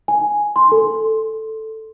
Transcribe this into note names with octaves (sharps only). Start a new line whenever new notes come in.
G#5
C6
A4